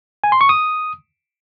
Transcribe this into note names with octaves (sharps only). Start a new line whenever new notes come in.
G#5
C6
C#6
D#6